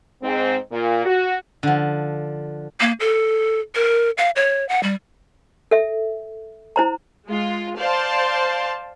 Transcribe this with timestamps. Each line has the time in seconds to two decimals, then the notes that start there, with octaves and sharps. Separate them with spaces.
0.23 G#2 C4
0.72 A#2
1.06 F#4
1.63 D3 F3
2.81 A#3
3.00 A4
3.75 A#4
4.18 F5
4.36 C#5
4.69 F#5
4.83 G3
5.71 A4 E5
6.76 E4 C5 A#5
7.26 G#3 F4
7.78 C5 D5 F5 A5 C6